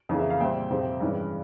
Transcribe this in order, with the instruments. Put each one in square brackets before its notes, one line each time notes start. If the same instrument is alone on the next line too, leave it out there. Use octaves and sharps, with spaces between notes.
[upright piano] F2 C#3 E3 A#3
E5
F5
A#2 G3 C4 E5 G5
F2 C3 F3 C4
G2 E3 G#3 C#4